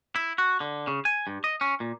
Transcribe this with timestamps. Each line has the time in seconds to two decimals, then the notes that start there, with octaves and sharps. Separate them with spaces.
0.16 E4
0.38 F#4
0.60 D3
0.87 C#3
1.05 G#5
1.27 G2
1.44 D#5
1.61 C#4
1.80 A#2